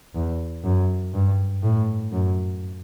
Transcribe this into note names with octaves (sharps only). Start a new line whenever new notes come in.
E2
F#2
G2
A2
F#2